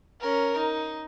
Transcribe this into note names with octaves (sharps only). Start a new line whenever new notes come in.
C#4 A#4
D#4